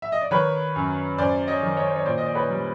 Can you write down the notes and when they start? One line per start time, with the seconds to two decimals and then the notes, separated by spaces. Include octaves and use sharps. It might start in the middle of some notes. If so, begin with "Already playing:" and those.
0.02 E5
0.12 D#5
0.21 D5
0.31 D#3 B4 C#5
0.76 F#2
1.18 F#2 C5 D5
1.48 C#5 D#5
1.62 D#3
1.77 C#5 D#5
1.87 C5
1.96 C#5
2.06 A#2 C5 D5
2.18 D#5
2.26 D5
2.35 B4 C#5
2.49 G3